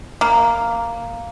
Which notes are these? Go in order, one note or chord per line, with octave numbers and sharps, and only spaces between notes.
A#3